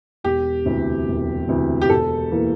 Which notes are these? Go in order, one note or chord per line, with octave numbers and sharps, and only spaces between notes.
E1 G4
D2 C3 E3
E1
D2 C3 E3
G4
E1 A4
E3 A#3